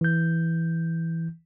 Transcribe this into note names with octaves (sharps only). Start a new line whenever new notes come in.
E3 G6